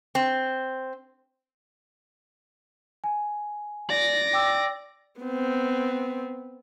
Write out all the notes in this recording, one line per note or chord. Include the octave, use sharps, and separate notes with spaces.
C4
G#5
D5 A#6
G5 D6 E6
B3 C4